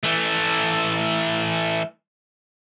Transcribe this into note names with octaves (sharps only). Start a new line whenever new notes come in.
E3 A3